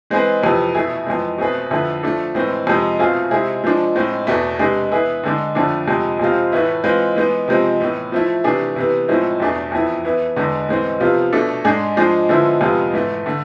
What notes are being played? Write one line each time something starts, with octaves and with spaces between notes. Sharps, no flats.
E3 G#3 C4 G#4 B4
F2 C3 E3
B2 A3 E4 G#4
F2 E3 G#3
B2 A3 C4 G#4 B4
F2 D3 A3 E4 B4
F3 A3 D4 A4
A2 E3 G#3 C4
F2 C3 G#3
B2 A3 C4 F4 G#4
C3 G#3 C4 E4 G#4
F3 G#3 D4
A2 G#3 C4
E2 B2 A3
C3 G#3 D4 G#4 B4
E3 B3 E4 G#4 B4
D3 G#3 D4
F2 D3 F3 A3 D4
F2 C3 G#3
F2 C3 G#3 C4 F4
A2 E3 A3 E4 B4
E3 G#3 C4 F4 B4
E3 G#3 B3
C3 F3 G#3 C4
A2 E3 B3
F3 A3 E4
C3 E3 A3 D4 G#4
C3 E3 B3
A2 F3 G#3 C4 E4
E2 B2 A3 D4 G#4
F2 E3 B3 E4
E3 B3 E4
E2 D3 G#3 B3
A2 E3 G#3 C4
C3 F3 B3 F4
B2 A3 D4 A4
G#2 G#3 D4 G#4
F3 G#3 D4 G#4
D3 F3 G#3 B3 E4
F2 C3 G#3 B3 F4
G#2 E3 A3
D3 A3